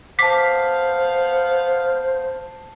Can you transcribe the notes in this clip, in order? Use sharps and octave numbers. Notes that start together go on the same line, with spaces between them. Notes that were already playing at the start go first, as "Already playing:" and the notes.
B3 C5 F5 A5 D6 B6 C7